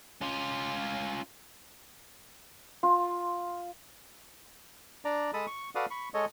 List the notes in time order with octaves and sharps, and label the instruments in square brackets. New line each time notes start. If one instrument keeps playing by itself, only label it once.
[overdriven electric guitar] C#4 F4
[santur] F4
[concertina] D4 D5 A#5
G#3 A4 A5 B5 D#6
C#6
F#4 A4 B4 D5 F5 D#6
B5 C#6
G#3 A4 C#5 D#5